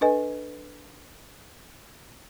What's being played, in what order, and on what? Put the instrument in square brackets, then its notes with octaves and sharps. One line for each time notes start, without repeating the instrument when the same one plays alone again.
[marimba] D4 A4 B4 D#5 G#5